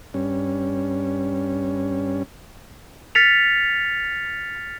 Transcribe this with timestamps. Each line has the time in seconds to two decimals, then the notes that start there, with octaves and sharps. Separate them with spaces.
0.14 G2 C#4
3.15 F6 A6 B6 C#7 F7